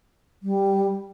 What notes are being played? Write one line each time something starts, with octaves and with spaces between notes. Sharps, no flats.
G3